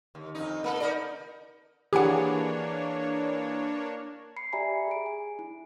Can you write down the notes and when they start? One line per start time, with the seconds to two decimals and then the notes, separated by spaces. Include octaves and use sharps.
0.15 D#2
0.35 F2 D#4
0.64 A#3 A4
0.80 D#4 A#4 D5
1.93 E3 A#3 D4 G4 G#4 B4 C#5 F#5
4.36 B5 C7 C#7
4.53 G4 D5 E5 G#5 A#5 B5
4.88 G#4 D7
5.06 G#5
5.39 E4